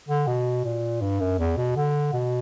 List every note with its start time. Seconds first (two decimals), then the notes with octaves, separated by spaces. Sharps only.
0.09 D3
0.27 B2
0.65 A#2
1.01 G2
1.20 F#2
1.39 E2
1.57 B2
1.76 D3
2.13 B2